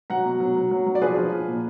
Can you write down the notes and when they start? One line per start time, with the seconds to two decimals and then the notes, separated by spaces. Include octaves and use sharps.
0.10 F#3 F#5 A#5
0.25 B2
0.40 F#3
0.56 F#3
0.71 F#3
0.86 F#3
0.95 D5
1.01 F3 G#4 B4
1.17 F3
1.33 F3
1.48 A#2